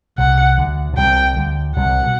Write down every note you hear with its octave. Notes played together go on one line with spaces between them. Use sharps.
C2 C3 F#5
D2 D3
B2
C2 C3 G5
D2 D3
C2 C3 F#5
B2